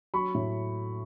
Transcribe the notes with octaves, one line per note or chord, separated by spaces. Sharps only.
F#3 B5 C#6
A2